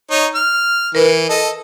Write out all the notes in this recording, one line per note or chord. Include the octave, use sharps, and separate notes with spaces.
D#4 C#5
F6
E3 A#4 B4
A4 D#5